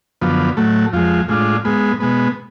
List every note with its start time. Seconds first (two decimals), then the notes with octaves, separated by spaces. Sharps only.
0.21 F#2 D3 F3 B3
0.57 A2 F#3 A3
0.93 F2 F3 G#3
1.28 A2 G#3 D4 F4
1.65 G#2 G#3 B3
2.00 B2 G#3 B3